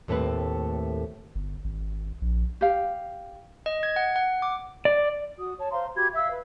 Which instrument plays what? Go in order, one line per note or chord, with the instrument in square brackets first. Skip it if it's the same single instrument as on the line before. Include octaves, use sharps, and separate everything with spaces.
[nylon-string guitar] D#2 A2 A3 C4 B4
[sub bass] G1
G#1
A#1
[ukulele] G4 F5
[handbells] D#5
G#6
F#5
F#5
D6
[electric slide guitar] D5
[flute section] F#4 D#6
C#5 A5
C5 F5 A#5 C6
F#4 G4 B5 G#6
E5 F5 E6
B4